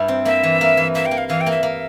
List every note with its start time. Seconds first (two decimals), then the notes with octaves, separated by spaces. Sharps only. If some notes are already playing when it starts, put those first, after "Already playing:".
Already playing: G2 E4
0.08 C4
0.25 A#3 E5
0.43 E3
0.61 A#3
0.77 E3
0.95 A#3 E5
1.06 G5
1.11 A#3
1.18 F5
1.28 E3 F5
1.41 G5
1.46 A#3
1.52 E5
1.63 A#3